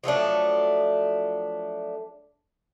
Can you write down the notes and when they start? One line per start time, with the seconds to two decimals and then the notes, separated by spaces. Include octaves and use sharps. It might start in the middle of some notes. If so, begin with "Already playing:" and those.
0.04 F3 F#3 A3 D4